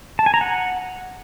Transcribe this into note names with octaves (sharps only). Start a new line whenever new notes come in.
A5
G#5
A#5
F#5